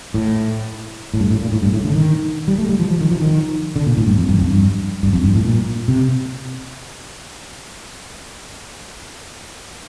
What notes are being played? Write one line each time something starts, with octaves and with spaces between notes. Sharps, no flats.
A2
A2
G2
A2
A#2
A2
G2
A2
D3
D#3
G3
A3
G3
F3
F3
D#3
F3
D#3
D3
A#2
A2
G2
F2
G2
F2
G2
G2
F2
G2
A2
A#2
C3